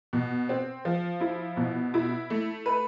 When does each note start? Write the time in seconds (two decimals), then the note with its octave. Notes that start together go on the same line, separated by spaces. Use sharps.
0.13 B2
0.49 C4
0.85 F3
1.21 E4
1.57 B2
1.94 E4
2.30 A3
2.66 B4